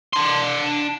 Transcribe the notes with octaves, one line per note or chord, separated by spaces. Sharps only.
D4 C6